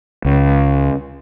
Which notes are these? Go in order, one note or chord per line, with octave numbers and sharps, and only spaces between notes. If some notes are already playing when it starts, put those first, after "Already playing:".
C#2